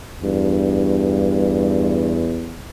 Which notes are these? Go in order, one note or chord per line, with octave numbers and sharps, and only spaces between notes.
E2 G2